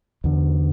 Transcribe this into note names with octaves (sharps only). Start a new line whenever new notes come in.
E2 D3